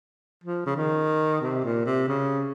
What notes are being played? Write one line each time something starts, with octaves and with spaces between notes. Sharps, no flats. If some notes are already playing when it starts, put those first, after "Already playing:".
F3
C#3
D#3
C3
A#2
C3
C#3